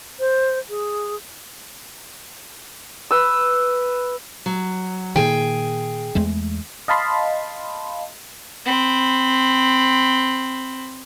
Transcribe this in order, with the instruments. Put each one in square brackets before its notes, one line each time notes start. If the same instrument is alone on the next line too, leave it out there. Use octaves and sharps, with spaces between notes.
[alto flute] C5
G#4
[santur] B4 E6
[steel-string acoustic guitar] F#3
[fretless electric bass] A#2 D#3 [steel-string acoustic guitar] G#4 G5
[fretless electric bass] E2 G#3 A3
[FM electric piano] D#5 F5 A5 B5 C6
[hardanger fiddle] C4 B5